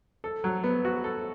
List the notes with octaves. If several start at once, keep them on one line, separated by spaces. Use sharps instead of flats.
A4
F#3
B3
F#4
A4